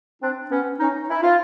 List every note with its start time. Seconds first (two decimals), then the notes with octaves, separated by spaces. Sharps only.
0.22 C4 D4
0.51 B3 C#4
0.79 C#4 D#4
1.10 E4
1.23 F4